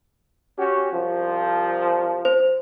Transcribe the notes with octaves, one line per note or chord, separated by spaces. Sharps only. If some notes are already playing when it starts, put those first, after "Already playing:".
C#4 F#4 G4
C2 F3
C5